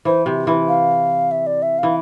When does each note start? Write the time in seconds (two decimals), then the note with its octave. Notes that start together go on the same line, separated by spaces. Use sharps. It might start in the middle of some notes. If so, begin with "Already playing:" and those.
0.05 E3 C5
0.26 C3
0.47 E3
0.68 F5
1.31 E5
1.47 D5
1.62 E5
1.79 E3 F5